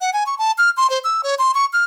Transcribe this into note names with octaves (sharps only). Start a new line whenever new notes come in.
F#5
G#5
C#6
A5
F6
C6
C5
E6
C#5
C6
C#6
F6